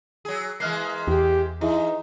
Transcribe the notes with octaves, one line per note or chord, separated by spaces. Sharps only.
F#3 G#4
E3 G#3 A#3 F6 F#6 C7
E2 G4
E3 D#4 E4 G#4 E5